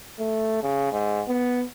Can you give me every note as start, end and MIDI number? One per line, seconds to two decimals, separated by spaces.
0.20 0.63 57
0.63 0.91 49
0.92 1.21 44
1.28 1.64 59